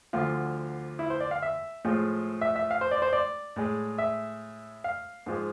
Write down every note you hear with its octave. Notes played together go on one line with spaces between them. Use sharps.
D2 D3 F3 F4
E4
C5
D5
F5
E5
A2 F3 G#3
E5
E5
F5
C5
D5
C5
D5
A2 G#3
E5
F5
G#2 F3 G#3